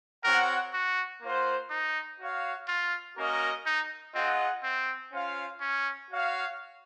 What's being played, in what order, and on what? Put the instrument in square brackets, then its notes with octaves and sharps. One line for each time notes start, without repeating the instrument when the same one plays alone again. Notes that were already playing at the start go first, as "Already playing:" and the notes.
[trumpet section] C4 F#4 C#5 F#5 [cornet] A#4
[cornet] F#4
[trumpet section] A#3 F4 C5 F#5
[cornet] D#4
[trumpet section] F#4 C#5 F5
[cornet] F4
[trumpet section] A#3 C#4 F#4 A#4 D#5
[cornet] D#4
[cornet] C4 [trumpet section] F4 G#4 D#5 F#5
[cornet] C4
[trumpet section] C#4 F4 C5 F5
[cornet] C#4
[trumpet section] F#4 C#5 F5